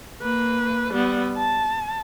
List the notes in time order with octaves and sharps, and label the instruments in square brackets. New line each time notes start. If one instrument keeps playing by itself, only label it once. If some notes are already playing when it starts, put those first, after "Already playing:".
[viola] A#3 B4
G3 B3
A5